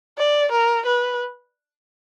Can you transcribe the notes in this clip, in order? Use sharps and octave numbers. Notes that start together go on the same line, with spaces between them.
D5
A#4
B4